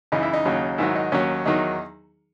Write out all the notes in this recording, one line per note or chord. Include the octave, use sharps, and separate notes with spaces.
F#2 C#3 E3 D#4
E4
D#4
D#2 C#3 F#3
G#2 D#3 F#3 E4
D#4
D#2 D#3 F#3 C#4
E2 D#3 F#3 D#4